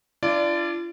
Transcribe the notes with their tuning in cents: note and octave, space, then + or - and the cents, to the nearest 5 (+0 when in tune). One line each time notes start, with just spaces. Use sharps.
D4 -5 F4 -40 D5 +0